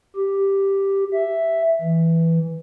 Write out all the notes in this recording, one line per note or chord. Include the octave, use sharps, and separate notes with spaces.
G4
E5
E3